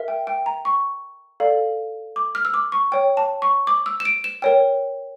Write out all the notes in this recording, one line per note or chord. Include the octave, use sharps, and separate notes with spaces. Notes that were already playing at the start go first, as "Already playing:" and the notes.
Already playing: A#4 E5
G5
G5
A#5
C#6
A4 D5 F5
D6
F6
E6
D6
C#6
C#5 G5
A5
C#6
D6
E6
E7
D7
E7
A#4 C#5 G5